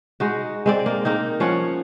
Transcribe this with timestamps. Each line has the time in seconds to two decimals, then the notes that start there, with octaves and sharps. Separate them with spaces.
0.20 G#3 D#4 F#4
0.66 G#3 C4 D5
0.86 A#3
1.05 A#3 C4 D#4
1.40 F3 C#4 C#5 F#5